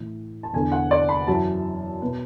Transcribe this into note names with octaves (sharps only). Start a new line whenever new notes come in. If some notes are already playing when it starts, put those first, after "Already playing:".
Already playing: A2 E3
A5
E2 D3 G#5
F#5
D5
B5
F#2 E3 A5
B2 B4